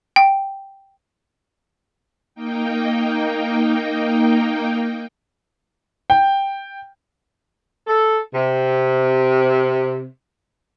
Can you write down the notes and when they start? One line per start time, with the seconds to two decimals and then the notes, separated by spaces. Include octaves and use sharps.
0.16 G5
2.35 A#3 D#4 G5
6.10 G5
7.87 A4
8.33 C3